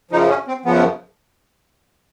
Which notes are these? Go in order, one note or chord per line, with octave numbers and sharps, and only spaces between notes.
F#2 C#3 F3 D#4
C#4
C4
F#2 C#3 F3 B3